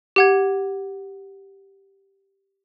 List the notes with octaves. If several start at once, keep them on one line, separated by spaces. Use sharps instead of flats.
G4 F#5 G#6